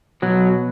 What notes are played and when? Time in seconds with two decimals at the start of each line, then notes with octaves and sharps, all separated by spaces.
0.22 B2 F#3